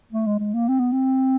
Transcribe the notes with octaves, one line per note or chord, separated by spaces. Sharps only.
A3
G#3
G#3
A#3
C4
B3
C4